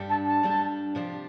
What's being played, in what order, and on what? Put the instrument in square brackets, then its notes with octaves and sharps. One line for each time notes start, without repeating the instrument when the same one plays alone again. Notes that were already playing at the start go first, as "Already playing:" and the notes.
Already playing: [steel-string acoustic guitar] G2 G3 D4 A4
[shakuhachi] A5
A5
[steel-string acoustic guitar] G2 G3 D4 A4
C3 F3 D4 G4